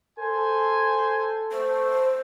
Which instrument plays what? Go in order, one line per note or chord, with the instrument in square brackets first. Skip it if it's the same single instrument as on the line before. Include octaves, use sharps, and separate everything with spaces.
[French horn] A4 [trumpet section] C5 G#5
[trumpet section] A3 [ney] C5